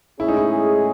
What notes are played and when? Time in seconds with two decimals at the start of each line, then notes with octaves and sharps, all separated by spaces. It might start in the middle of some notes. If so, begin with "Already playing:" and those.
0.20 A2 G#3 C#4 E4 G#4
0.29 D#4
0.37 E4